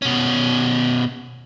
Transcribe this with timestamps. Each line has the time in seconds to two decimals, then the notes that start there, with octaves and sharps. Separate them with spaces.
0.02 B2 C#4